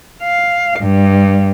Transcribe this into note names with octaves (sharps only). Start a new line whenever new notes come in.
F5
G2